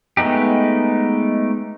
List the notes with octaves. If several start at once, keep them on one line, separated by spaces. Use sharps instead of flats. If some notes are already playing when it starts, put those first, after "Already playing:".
G#3 A3 B3 D#4 G4